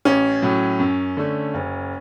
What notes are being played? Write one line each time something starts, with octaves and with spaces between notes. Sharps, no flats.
A1 C#4
A2 F#3
F#2
D3 A3
F#1